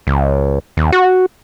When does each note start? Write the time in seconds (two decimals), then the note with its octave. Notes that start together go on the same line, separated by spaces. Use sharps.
0.07 C#2
0.77 D#2
0.92 F#4